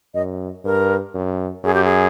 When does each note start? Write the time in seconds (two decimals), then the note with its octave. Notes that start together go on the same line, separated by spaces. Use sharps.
0.14 F#2 D#5
0.64 G2 A#4
1.14 F#2
1.64 F#2 G#4
1.74 G4
1.84 G#4